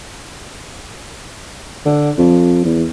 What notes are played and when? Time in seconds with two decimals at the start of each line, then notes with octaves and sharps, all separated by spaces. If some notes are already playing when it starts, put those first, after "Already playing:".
1.85 D3
2.18 F2
2.65 E2